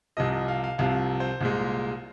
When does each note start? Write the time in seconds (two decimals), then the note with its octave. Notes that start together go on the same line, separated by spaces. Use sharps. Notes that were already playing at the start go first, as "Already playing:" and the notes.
0.17 C2 C3 F3 D#5
0.32 D#5
0.48 F5
0.64 F5
0.78 C2 C3 F3 F5
1.20 C5
1.41 C2 A#2 G#3